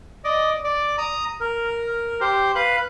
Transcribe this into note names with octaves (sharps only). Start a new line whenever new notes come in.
D5 D#5
D5
A#5 D#6
A#4
G4 C5
B4 F5 F#6